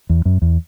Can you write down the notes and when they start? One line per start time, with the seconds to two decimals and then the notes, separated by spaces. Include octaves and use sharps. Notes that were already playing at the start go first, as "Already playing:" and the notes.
0.09 E2
0.25 F#2
0.42 E2